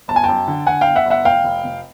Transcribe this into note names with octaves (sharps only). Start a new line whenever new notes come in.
G1 A5
G#5
F#2 G5 A5
D3
D3 F#5 G#5
G1 F5 G5
E5 F#5
G1
E5 F#5
F1 F5 G5
F1
F1